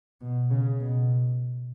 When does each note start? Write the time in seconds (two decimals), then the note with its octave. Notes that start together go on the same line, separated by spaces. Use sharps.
0.21 B2
0.50 C#3
0.80 B2